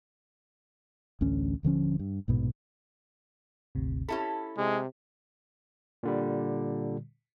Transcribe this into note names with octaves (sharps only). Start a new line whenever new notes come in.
A1 D2 D3 C#4
D#1 D3 F3 C#4
G2
A#1 G#2 B2
G#1 D2 C3
C#4 E4 G4 A4 B5
C3 G#3
A#2 D3 G3